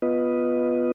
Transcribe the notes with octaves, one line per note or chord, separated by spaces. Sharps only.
B3 F4 B4 D#5